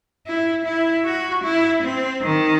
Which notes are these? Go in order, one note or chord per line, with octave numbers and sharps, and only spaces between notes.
E4
E4
F#4
E4
C4
D#3